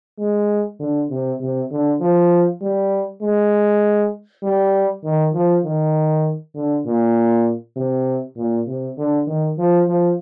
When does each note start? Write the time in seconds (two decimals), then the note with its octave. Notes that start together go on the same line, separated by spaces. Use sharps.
0.18 G#3
0.79 D3
1.10 C3
1.40 C3
1.70 D3
2.00 F3
2.61 G3
3.22 G#3
4.43 G3
5.04 D#3
5.33 F3
5.64 D#3
6.55 D3
6.85 A#2
7.76 C3
8.36 A#2
8.67 C3
8.97 D3
9.27 D#3
9.58 F3
9.88 F3